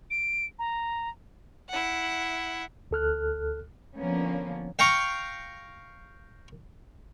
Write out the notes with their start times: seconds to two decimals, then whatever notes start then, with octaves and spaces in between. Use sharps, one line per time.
0.11 D7
0.59 A#5
1.69 E4 F#5
2.91 D2 A4 F6 F#6
3.96 D3 F3 A#3 B3 C#4
4.79 F5 G5 A#5 C#6